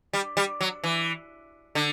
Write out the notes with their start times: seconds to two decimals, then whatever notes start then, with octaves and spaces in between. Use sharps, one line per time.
0.13 G3
0.37 G3
0.61 F#3
0.84 E3
1.75 D3